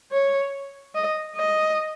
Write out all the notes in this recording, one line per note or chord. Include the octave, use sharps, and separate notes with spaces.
C#5
D#5
D#5